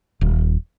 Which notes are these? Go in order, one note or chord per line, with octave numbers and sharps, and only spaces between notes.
D#1